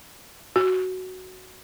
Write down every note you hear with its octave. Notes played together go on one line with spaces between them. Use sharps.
F#4